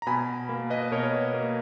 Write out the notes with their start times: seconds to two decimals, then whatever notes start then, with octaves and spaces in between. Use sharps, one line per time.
0.02 A#5
0.07 B2 G#5 B5
0.49 A#3
0.70 B4 D#5
0.92 B2 A#4 C#5
1.34 A#3